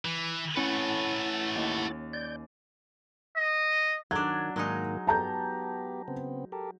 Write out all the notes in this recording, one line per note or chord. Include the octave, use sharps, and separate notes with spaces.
E3
A3 C#4 E4 B4 F#5 A6
D#2
D5 G6
D#5
D#3 F#3 D4 G#6
G#2 D#3 F#3 G#3 A#3 D#4
B3 G4 A5 A#5 G6
C#3 B3 C4
G4 A4 A#4